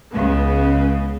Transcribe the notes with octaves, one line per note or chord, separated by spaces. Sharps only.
C#2 C#3 B3